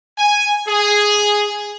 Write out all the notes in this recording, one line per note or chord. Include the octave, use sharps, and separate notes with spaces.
G#5
G#4